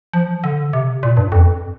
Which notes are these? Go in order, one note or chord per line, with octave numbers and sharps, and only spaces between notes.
F3
D3
C3
A#2
G2
F2